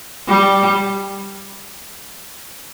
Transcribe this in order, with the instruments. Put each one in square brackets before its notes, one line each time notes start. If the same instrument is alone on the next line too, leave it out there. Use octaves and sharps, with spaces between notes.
[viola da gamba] G3